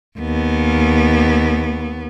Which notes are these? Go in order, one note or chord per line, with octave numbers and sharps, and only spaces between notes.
D#2 B3